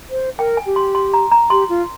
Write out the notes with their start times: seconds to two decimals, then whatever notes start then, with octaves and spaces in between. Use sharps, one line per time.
0.10 C5
0.38 A#4 G5
0.57 G#5
0.66 G4
0.76 C6
0.95 C6
1.14 A#5
1.32 A#5
1.50 G4 C6
1.69 F4